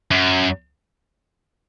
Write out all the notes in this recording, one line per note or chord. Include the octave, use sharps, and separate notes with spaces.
F#2